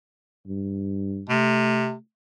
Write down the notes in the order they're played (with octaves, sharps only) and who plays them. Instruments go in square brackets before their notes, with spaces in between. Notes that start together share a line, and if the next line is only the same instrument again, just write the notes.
[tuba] G2
[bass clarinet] C3 [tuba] A3